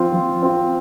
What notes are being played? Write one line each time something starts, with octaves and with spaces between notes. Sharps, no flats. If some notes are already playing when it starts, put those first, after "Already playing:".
Already playing: F3 C4 F4
F3
C4 F4